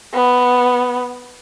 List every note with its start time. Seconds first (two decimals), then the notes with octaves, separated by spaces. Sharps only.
0.14 B3